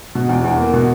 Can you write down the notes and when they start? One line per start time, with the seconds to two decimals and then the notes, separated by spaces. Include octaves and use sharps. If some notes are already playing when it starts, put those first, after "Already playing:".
0.15 B2
0.29 E2
0.44 E2
0.58 A#3
0.73 B2